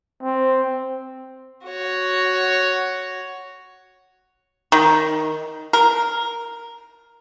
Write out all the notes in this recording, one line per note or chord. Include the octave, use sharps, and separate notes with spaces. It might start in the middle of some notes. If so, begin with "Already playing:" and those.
C4
F#4 C#5
D#3
A#4